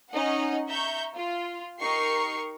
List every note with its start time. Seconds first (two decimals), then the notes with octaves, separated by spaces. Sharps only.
0.11 C#4 D#4 D#5 F#5
0.68 E5 A#5 C#6 G6
1.15 F4
1.80 D#4 G4 A#4 C#6 C7